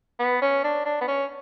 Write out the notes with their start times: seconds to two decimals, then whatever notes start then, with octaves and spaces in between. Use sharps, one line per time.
0.19 B3
0.41 C#4
0.64 D4
0.85 D4
1.01 B3
1.07 C#4